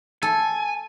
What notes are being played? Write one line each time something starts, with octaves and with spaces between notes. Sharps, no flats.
A4 G#5